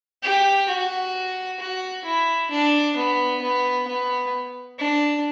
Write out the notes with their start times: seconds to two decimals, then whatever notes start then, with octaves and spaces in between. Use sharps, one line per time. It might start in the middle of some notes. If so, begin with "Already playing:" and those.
0.23 G4
0.69 F#4
1.60 F#4
2.05 E4
2.51 D4
2.97 B3
3.42 B3
3.87 B3
4.79 D4